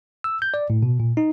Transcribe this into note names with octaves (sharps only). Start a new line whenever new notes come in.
E6
G6
D5
A2
B2
A#2
D#4